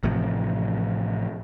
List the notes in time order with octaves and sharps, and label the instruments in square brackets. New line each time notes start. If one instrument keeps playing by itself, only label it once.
[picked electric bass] A1 A2 C3 F3